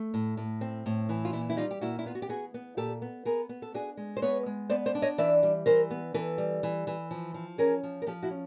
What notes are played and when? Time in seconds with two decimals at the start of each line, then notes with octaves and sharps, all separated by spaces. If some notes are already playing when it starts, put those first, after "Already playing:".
Already playing: A3
0.14 A2
0.37 A2
0.61 C4
0.86 A2
1.09 E3
1.25 F4
1.33 A#2 E4
1.50 E4
1.57 G3 D#4 F4
1.71 G4
1.81 A#2 E4 F#4
1.99 E4
2.06 B3 F4
2.15 F#4
2.22 G4
2.29 B3 F#4 G#4
2.54 B3
2.77 A#2 G4 A4
3.02 B3
3.25 B3 G#4 A#4
3.49 B3
3.62 A4
3.74 D4 F#4 G#4
3.97 G#3
4.17 C5
4.22 B3 B4 C#5
4.46 G#3
4.70 B3 C5 D5
4.86 C5 D5
4.95 D4
5.02 C#5 D#5
5.18 E3 D5 E5
5.43 G3
5.66 E3 A#4 C5
5.91 B3
6.14 E3 A4 B4
6.38 G3
6.63 E3
6.87 E3
7.11 F3
7.34 F3
7.58 C#4 G#4 A#4
7.83 F3
8.02 A#4
8.06 F3 G4 A4
8.23 E4 F#4
8.31 C#4